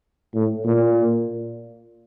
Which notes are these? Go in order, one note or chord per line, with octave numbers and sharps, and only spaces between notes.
A2
A#2